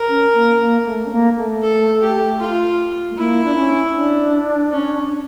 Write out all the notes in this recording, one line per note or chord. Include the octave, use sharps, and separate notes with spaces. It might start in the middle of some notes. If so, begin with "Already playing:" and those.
Already playing: A#4
C#4
A#3
A#3
A3
C#4
A#3
A3
A4
G4
F4
A3
A#3 E4
D4
C#4
D4
C#4